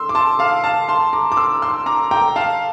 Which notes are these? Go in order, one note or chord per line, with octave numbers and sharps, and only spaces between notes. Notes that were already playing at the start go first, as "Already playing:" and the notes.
Already playing: C6 E6
D6
A5 C6
F5 A5
F5 A5
A5 C6
A#5 D6
D6
C6 E6
C6 E6
A#5 D6
G5 A#5
F5 A5